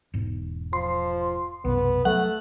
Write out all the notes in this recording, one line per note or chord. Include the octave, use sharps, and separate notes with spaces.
E1 G#2
F3 C6
B1 F#2 C3 B3
F#3 A3 F#5